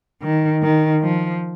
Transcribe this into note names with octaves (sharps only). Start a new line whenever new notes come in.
D#3
D#3
F3